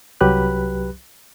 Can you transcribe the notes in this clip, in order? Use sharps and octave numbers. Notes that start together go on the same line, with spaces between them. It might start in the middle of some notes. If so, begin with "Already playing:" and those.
C2 F#3 G4 B4 B5 F#6